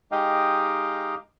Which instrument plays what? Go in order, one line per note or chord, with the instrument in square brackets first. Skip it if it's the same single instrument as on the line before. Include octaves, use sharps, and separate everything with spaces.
[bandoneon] G#3 D#4 G4 D#5 F5 G5